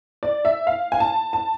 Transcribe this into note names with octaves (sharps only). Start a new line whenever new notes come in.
D5
E5
F5
G#5
A5
A5